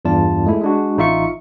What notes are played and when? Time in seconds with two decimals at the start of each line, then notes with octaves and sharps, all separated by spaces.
0.05 E2 G2 F4 D5 A5
0.46 G#3 A3 E4
0.62 G#3 D4 F#4
0.97 A1 D#4 F4 E5 C#6 C#7